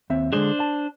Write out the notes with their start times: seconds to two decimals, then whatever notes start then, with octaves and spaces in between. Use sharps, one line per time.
0.10 D#2 C4 E5
0.33 D3 G#3 D4 G#4 C5
0.60 A5